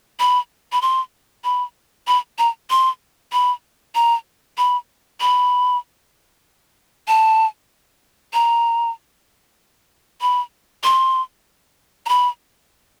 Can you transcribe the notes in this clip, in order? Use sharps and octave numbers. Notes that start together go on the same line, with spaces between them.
B5
B5
C6
B5
B5
A#5
C6
B5
A#5
B5
B5
A5
A#5
B5
C6
A#5
B5